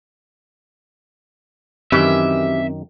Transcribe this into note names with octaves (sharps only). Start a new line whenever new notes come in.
F#2 D#3 E3 C4 C#4 G4 E5